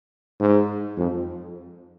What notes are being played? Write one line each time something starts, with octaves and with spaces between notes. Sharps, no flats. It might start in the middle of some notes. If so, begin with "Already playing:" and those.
G#2
F2